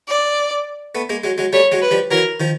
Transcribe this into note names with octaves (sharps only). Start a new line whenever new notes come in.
D5
A3 B3
G#3 A#3
F#3 G#3
F#3 G#3
G3 A3 C#5
F#3 G#3
B4
F3 G3
E3 F#3 A#4
D#3 F3